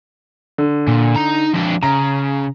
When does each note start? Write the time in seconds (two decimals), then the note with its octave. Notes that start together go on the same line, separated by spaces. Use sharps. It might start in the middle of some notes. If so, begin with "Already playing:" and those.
0.58 D3
0.88 A#2
1.16 D#4 A#5
1.54 F2 D4
1.83 C#3 A#5